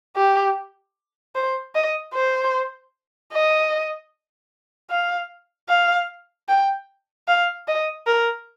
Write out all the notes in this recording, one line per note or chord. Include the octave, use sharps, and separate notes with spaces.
G4
C5
D#5
C5
D#5
F5
F5
G5
F5
D#5
A#4